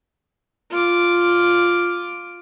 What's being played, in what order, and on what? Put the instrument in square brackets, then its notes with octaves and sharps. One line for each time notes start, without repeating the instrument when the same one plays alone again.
[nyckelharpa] F4 D6